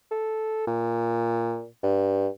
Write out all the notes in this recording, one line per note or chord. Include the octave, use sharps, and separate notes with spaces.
A4
A#2
G2